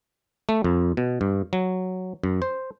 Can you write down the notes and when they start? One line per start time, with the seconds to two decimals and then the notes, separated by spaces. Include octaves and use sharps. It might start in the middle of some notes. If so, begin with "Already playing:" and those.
0.49 A3
0.64 F2
0.97 B2
1.21 G2
1.53 F#3
2.24 F#2
2.42 C5